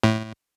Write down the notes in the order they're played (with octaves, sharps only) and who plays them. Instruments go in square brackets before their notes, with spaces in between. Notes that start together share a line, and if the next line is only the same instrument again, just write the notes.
[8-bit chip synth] A2